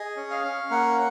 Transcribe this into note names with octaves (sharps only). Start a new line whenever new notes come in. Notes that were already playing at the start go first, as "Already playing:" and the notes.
Already playing: G#4 D#5
C#4
F5
C#4
A#3 F#5